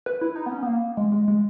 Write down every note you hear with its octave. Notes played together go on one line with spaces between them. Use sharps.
B4
E4
D#4
B3
C#4
B3
A#3
G#3
G#3
G#3